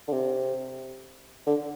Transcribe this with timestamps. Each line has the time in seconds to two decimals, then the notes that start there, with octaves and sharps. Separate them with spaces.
0.08 D3
0.13 C3
1.47 D3